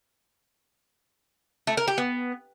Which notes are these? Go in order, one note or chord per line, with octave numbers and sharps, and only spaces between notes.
A3
A#4
G4
B3